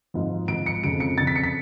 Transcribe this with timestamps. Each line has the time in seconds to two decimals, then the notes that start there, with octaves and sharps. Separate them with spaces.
0.14 G#2 F3
0.48 G#2 F3 D7
0.66 C#7
0.83 F2 C#3 F3 D7
1.00 C#7
1.18 F2 C#3 F3 A6
1.27 B6
1.36 C#7
1.43 B6